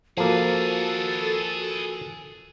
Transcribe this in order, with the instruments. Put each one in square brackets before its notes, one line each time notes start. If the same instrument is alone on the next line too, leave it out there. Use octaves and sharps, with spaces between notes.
[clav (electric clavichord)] F3 A#3 [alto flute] F#4 [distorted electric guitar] G#4 B4 [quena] A4